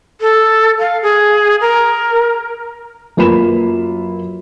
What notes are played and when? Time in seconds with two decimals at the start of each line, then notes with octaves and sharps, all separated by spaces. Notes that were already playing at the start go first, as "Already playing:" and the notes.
0.21 A4
0.80 F5
1.03 G#4
1.61 A#4
3.17 F#2 A#3 F4 B4 B5 E7